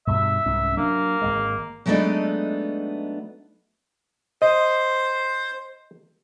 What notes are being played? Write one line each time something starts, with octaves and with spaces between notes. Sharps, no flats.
G2 B2 E5
C2 G#2 C#4
F#3 A#3 D4
G#1 G#3
F#3 G#3 A3 B3 D4 D#4
C5 D#5